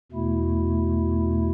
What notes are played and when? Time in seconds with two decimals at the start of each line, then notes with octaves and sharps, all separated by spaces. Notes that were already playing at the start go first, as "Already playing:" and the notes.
0.12 E2 B2 A3 E4